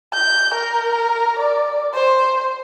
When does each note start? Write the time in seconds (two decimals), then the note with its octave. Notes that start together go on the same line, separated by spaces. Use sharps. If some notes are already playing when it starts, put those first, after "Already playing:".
0.14 G6
0.54 A#4
1.39 D5
1.94 C5